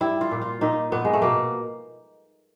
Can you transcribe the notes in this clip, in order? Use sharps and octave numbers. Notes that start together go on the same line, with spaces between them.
G3 E4
F4
A#2
F4
A#2 D#4
A#2 B3
G#3
A3
B2 A#3